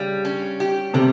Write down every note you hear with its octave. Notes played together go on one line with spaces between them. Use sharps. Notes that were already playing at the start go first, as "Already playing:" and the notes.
Already playing: C#3 G3
C#4
G4
C3 G3